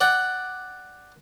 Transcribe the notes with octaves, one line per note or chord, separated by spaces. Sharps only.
D5 F#5 G5